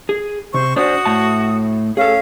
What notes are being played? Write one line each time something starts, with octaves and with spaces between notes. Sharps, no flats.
G#4
C3 C5 C#6
D4 F#4 C5 D#6
A2 E5 A5
C#4 G#4 A4 F5